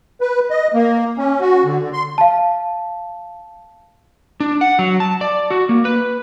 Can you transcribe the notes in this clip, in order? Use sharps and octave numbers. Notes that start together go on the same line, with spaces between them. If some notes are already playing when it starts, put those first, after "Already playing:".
B4
D#5
A#3
C#4
F#4
D3
D3
C6
F5 A5
D4
F#5
F#3
A5
D5
F#4
A#3
B4